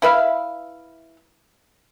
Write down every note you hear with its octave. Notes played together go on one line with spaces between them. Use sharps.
E4 B4 E5 F5